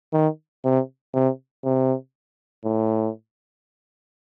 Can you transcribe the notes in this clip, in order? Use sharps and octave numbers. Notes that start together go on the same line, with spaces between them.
D#3
C3
C3
C3
A2